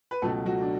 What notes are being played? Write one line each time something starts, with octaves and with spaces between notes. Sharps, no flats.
B4
C#2 B2 F#3 A3 A4
F#3 F#4
D4